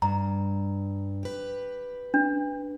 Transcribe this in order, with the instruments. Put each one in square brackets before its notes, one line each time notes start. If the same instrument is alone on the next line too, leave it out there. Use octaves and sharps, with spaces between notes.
[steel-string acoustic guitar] G2 [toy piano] A#5
[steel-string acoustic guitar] G4 B4
[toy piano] D4